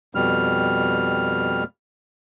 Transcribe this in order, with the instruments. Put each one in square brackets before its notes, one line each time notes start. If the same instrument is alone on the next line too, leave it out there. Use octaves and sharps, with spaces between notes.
[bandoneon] F2 B2 G3 F6